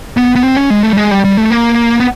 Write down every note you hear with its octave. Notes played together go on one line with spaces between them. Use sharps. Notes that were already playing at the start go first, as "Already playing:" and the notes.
B3
B3
C4
C#4
G#3
A3
G3
G#3
G3
G3
A3
A#3
B3